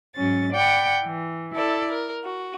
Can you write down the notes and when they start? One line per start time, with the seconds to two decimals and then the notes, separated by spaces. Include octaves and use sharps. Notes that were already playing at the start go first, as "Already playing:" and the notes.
0.16 G#2 F#3 C#4 A6
0.54 D5 F#5 G5 B5
1.03 E3
1.55 E4 A4 D5
1.91 A#4
2.24 F#4